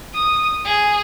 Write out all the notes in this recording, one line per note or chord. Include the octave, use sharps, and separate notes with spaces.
D#6
G#4